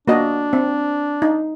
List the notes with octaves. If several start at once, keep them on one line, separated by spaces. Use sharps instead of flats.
A#3 D4 F#4 D#5
C4
D#4